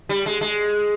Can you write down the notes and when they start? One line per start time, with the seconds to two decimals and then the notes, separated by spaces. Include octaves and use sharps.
0.09 G3
0.26 G#3
0.41 G#3